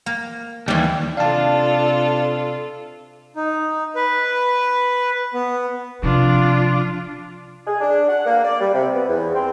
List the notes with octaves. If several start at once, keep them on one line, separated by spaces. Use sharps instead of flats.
A#3
D#2 E3 G3
C3 D4 F4 A4 F5 A5
D#4
B4
B3
C3 F3 D4 F4
G#4
D4
F#5
A#3
D5
G3
C3
B3
E2
C4